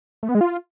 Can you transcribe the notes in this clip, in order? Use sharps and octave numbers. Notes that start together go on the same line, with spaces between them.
A3
B3
G#3
F4